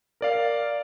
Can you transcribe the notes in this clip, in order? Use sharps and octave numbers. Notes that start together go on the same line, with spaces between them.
A#4 D5 F5